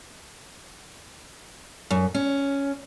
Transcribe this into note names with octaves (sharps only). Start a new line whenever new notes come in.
F#2
C#4